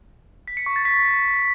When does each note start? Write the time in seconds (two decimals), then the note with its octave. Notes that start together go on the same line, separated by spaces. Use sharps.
0.48 B6
0.57 C#7
0.66 C#6
0.76 A6
0.85 B6